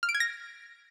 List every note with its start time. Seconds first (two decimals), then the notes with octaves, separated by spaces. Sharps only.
0.03 F6
0.09 D7
0.15 G#6
0.20 A#6